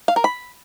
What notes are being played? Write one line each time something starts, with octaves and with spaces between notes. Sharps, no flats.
F5
A#4
B5